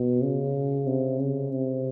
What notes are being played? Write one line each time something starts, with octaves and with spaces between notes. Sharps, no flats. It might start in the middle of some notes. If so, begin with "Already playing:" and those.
Already playing: B2
C#3
C3
C#3
C3